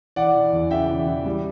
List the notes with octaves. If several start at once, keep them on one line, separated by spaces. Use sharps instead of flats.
E3 D5 F#5
E3
E2
C#3 E5 G5
E3
E3
G3